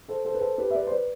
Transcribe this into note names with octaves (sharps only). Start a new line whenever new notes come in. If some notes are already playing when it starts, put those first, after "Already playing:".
A4 C5
A4 C5
B4
A4 C5
G4 B4
E5
B4 D5
C5
B4 D5